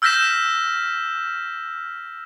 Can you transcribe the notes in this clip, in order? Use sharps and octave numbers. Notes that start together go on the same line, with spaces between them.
E6 F6 G6 A#6 B6 E7